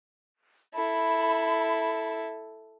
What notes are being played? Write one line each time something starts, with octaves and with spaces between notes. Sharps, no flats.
E4 A4 B5